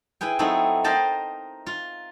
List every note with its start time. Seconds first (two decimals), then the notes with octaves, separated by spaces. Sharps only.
0.21 E4 G#4 B4 G5
0.39 F#3 A3 B3 C4 D#4 E4
0.84 A#4 C5 D#5 G5 A5 B5
1.66 F4